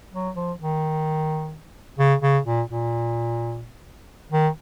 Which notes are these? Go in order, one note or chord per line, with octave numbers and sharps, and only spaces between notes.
F#3
F3
D#3
C#3
C#3
A#2
A#2
D#3